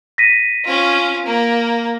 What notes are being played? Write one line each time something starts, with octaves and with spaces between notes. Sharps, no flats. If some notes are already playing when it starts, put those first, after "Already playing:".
A#6 B6 D#7
C#4 F4
A#3